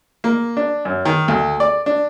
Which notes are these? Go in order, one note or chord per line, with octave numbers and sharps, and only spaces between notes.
A#3
D4
F#2
D#3
D2
D5
D4